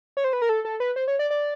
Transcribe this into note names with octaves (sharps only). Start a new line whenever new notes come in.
C#5
C5
B4
A#4
A4
A4
B4
C5
C#5
D5
D5